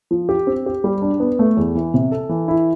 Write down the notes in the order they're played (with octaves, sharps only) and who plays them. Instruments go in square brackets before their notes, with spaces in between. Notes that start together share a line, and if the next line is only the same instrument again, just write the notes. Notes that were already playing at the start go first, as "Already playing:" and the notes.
[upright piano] F3
G4
C4
G4
G3
D4
B3
A3
E2
E3
C3
A4
E3
E4